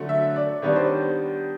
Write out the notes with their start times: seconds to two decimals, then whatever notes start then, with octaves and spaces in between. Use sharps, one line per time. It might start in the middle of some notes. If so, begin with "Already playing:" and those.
Already playing: D3 F#3 A3
0.09 E5
0.36 D5
0.62 D#3 G3 B3 D4 C#5
0.76 C5